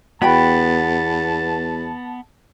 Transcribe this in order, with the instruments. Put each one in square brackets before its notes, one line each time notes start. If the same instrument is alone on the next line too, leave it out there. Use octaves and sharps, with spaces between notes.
[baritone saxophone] E2 [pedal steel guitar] B3 [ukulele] F#4 G5 B5 [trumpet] A5